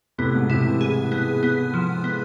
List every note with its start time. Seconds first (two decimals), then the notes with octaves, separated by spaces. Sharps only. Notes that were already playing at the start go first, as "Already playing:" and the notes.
0.18 A2 C3 B3
0.34 G#2 B2
0.49 A2 C3 E4
0.65 C3 E3
0.81 G#4
1.12 B3
1.43 B3
1.74 F3
2.04 B3